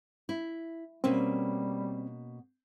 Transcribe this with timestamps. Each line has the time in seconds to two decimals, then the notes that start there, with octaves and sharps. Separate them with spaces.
0.29 E4
1.04 B2 G3 A#3 C4 C#4